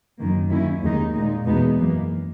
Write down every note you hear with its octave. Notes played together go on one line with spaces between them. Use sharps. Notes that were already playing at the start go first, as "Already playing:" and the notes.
F#2 D#3 A#3
D#2 D#3 F#3 C#4 E4
D#2 D#3 G#3 D#4
A#2 G#3 D#4
E2 B2 G#3 B3 D#4
F#2 E3 A#3